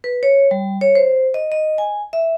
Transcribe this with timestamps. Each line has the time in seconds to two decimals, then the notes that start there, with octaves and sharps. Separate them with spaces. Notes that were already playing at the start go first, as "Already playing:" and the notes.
0.04 B4
0.23 C#5
0.51 G3
0.81 C#5
0.95 C5
1.34 D#5
1.52 D#5
1.78 G#5
2.13 E5